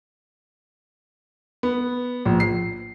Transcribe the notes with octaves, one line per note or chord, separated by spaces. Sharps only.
B3
A#1
C7